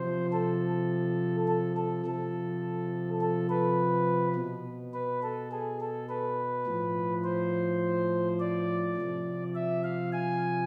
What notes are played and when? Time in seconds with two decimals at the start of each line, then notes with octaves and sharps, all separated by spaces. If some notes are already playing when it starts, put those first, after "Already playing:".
Already playing: C3 F3 C5
0.32 A4
1.48 A4
1.77 A4
2.06 C3 F3 A4
3.21 A4
3.50 B4
4.36 B2
4.94 B4
5.23 A4
5.51 G#4
5.80 A4
6.09 B4
6.67 A2 F3
7.24 C5
8.40 D5
8.97 C3 F3
9.55 E5
9.84 F5
10.13 G#5